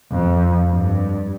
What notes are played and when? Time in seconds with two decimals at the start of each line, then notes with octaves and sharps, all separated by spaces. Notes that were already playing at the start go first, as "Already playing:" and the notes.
0.11 F2
0.70 G2